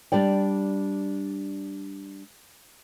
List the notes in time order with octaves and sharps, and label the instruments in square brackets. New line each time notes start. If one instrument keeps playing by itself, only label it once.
[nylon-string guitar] G3 D4 D5 G5